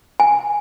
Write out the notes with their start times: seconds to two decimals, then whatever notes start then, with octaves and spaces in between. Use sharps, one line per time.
0.20 G#5